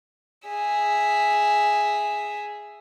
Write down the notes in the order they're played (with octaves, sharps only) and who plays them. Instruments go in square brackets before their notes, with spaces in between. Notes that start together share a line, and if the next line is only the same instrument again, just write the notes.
[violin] G#4 E5